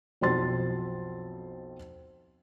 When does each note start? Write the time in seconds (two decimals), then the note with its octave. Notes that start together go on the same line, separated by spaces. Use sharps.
0.21 B1 F2 C4 C6 A6